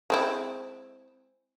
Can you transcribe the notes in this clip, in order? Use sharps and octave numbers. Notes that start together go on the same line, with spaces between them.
G#3 C4 E4